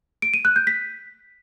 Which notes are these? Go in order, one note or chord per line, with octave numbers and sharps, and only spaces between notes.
D7
D#7
F#6
G6
B6